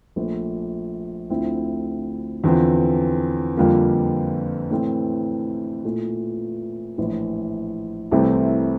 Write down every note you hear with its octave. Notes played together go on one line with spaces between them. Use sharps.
A#1 A#2 A3
D2 D3 F3 C4 E4
E2 D3 F3 C4
F2 D3 G3 A#3 F4
A2 E3 A3 C4
A#2 A3 E4
A#1 A2 E3
C2 C3 E3 A3 C4